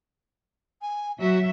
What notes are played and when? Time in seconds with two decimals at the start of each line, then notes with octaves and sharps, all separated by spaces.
0.82 G#5
1.21 F#3 F#4 E5